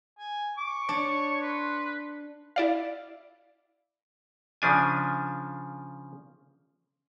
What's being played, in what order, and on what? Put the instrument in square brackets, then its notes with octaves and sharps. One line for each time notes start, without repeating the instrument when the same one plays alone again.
[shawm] G#5
[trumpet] C#6 [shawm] D6
[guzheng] D4 [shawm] C#5
[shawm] B4 [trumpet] C6
[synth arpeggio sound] E4 D5 F5
[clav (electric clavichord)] C#3 F3 D4 G#5